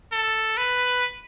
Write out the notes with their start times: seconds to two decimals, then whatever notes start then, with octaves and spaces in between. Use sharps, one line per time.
0.12 A4
0.57 B4